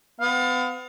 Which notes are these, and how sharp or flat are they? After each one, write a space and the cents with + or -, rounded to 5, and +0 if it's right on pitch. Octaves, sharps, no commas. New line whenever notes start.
B3 +35 F5 +35